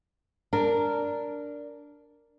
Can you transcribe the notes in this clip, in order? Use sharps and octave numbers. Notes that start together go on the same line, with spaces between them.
D4 A#4